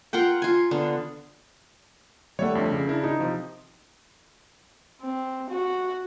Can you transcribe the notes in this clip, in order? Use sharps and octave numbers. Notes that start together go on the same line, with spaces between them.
F4 A#4 F#5 G5
F4 G#5
D3 B3
G3 A3 C#5 E5 F#5
F2 D3
C#3
D4 E4 A#4
D#4
C3 F3
C4
F#4